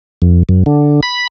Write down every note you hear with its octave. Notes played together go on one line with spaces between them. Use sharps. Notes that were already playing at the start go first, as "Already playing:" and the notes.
F2
F#2
D3
B5